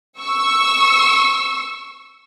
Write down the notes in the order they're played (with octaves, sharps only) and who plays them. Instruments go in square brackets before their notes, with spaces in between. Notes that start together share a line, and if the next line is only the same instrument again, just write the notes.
[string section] C#6 E6